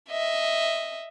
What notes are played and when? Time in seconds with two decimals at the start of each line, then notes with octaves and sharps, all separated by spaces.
0.10 D#5 E5